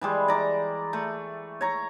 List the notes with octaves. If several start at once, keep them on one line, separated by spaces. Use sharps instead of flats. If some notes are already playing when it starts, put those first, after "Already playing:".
E3 G3 G#3
D5 A#5
A3
C#5 A#5